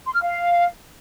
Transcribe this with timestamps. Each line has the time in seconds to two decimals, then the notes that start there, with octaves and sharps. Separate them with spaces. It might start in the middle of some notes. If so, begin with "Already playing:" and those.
0.06 C6
0.14 F6
0.22 F5